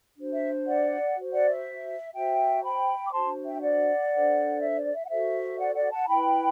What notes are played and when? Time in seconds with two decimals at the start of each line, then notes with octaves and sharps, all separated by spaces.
0.17 D4 F#4 C5
0.33 E5
0.66 D5 F#5
1.15 F#4 C5
1.32 D5 F#5
1.48 E5
2.13 F#4 C5 E5 G5
2.64 G5 B5
3.08 D6
3.12 D4 F#4 C5 A5 C6
3.45 E5 G5
3.62 D5 F#5
4.11 D4 A4 C5
4.60 E5
4.77 D5
4.93 E5
5.05 F#5
5.09 F#4 A4 C5 E5
5.59 D5 F#5
5.75 D5 F#5
5.91 F#5 A5
6.08 E4 B4 G5 B5